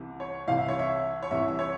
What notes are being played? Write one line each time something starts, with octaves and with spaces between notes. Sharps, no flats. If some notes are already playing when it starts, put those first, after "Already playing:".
Already playing: C2 C3 E3
C#5
C2 C3 E3 F5
E5
C#5
E5
C#5
C2 C3 E3 E5
E5
C#5